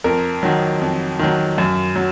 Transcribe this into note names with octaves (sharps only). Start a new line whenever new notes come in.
F2 A#4
D#3 F#3
F2
D#3 F#3
F#2
F#3